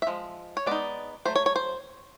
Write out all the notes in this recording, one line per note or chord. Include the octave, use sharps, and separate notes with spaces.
E5
F3 G#3
C#5
G#3 B3 D#4 D5
F#3 A3 C5
C#5
C#5
C5